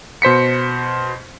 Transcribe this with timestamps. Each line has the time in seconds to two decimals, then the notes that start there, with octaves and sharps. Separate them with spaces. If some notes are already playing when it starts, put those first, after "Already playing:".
0.22 B2 C5 B6 C#7